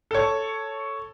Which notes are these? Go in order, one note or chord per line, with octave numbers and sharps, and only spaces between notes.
A4 C#5